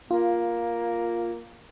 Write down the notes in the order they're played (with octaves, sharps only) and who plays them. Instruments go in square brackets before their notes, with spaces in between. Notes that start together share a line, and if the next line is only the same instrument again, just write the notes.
[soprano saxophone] A#3 [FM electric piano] F4